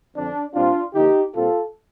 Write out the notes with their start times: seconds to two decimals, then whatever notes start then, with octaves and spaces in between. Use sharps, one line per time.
0.15 F2 D3 F3 C4 D4
0.55 A#2 G3 C4 D4 F4
0.94 D3 F3 A#3 D#4 G4
1.34 A#2 G3 C4 F4 A4